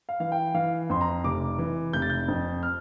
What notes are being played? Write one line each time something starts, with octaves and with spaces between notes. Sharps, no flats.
F5
E3 F5
G5
E3 F5
F2 C6
A#5
F1 D6
E3
F1 G6
A6
G6
F2
F6